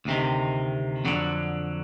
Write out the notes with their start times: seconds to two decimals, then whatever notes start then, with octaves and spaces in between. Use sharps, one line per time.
0.05 D2 C3 D#3
1.05 F2 D3 F#3